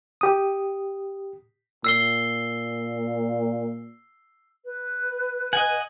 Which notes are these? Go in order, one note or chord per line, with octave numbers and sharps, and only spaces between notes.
G4 D#6
A#2 E6 C7 G7
B4
D#5 F#5 G#5